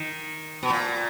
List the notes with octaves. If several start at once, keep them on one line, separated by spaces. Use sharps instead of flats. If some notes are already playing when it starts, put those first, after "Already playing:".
Already playing: D#3
B2
A#2